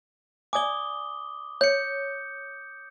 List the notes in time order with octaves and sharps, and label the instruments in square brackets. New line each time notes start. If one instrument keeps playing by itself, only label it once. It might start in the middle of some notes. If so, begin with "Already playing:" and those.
[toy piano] D5 G#5 [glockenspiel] D6 D#6 G7
[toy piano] C#5 [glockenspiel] G6 C#7